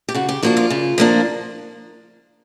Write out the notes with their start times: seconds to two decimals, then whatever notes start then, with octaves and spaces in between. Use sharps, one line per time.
0.09 G4
0.14 C#3 F#4
0.29 G4
0.43 F3 A#3 D4 F#4
0.57 F4
0.70 C#3
0.98 F3 A#3 D4